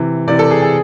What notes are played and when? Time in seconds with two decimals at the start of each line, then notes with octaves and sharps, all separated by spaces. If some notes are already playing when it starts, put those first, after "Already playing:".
Already playing: C3 E3
0.28 C3 E3 D5
0.39 A4
0.51 G#4
0.62 G#4